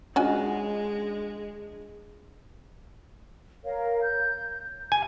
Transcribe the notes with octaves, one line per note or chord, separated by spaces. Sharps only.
G#3 C#4 D4 F4 F#4 D#5 G#5
A#4 C#5 F5
G6
G4 G#5